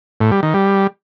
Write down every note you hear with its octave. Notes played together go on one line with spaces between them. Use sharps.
A2
G3
D#3
G3